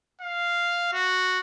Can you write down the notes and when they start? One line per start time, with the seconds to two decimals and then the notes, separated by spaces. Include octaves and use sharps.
0.21 F5
0.93 F#4